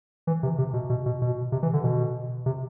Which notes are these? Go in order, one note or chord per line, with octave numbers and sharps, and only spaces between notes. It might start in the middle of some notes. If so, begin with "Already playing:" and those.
E3
C3
C3
B2
B2
B2
B2
C3
E3
D3
B2
C3